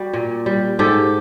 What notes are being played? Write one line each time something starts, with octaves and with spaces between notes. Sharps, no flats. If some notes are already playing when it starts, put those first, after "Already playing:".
Already playing: G3 F#4
A#2
G3
G#2 G4 A4